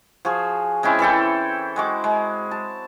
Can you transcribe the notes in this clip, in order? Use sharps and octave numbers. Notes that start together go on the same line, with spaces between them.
F3 F#4 G#4
G#3 C4 C#4 E4
E3 E4 A4 G5
G#3 F#4 D6
G#3
A5